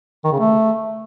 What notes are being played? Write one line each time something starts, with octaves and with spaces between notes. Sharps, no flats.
D#3
C#3
A3